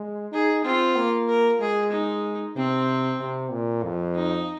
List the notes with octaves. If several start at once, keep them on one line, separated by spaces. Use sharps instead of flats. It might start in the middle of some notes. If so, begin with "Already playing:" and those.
Already playing: G#3
D#4 G#4
C4 F4
A#3
A#4
G#3 G#4
D#4
C3 C4
C3
A#2
F2
D#4